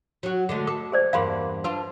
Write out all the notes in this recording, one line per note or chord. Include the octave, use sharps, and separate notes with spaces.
F#3 F#4
D3 G#3 A3
A4 D6
G#4 C5 D5
E2 G2 A#3 F5 B5 C6
D4 F4 B4